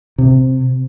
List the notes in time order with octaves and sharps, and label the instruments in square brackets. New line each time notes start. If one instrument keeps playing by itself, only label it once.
[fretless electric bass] C3